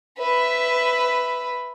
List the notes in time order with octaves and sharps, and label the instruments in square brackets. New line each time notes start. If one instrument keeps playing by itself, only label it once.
[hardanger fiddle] B4 E5